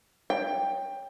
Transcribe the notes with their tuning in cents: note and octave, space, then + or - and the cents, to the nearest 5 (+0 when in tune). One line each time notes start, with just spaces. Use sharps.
C#5 +0 G5 +15